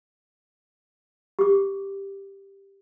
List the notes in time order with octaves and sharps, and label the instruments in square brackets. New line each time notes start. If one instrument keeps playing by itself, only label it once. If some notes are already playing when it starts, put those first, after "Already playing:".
[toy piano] G4 D6